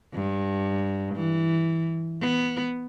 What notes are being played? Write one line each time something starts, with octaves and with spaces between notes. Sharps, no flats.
G2
E3
B3